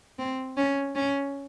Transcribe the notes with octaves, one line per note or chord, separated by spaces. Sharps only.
C4
C#4
C#4